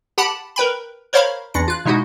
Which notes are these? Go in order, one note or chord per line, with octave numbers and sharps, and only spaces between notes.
G4 F#5 A5 B5
A#4 B4 G5 B5
A#4 C5 C#5 F5 A#5 B5
E2 D4 A#6 C#7
F4 F#6
B2 G#3 D#4 E4 F#4